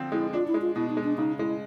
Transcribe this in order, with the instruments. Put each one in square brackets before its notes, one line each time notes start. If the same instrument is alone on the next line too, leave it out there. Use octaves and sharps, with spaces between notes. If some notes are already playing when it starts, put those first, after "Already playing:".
Already playing: [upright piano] D3 F3 C4
[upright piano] G#3 [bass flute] E4
[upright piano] D4 [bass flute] F4
[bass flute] E4
[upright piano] G#3
[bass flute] F4
[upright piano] B2 [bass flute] E4
[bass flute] D#4
[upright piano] G#3
[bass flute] D4
[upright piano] C#3 [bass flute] D#4
[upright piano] G#3 [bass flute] E4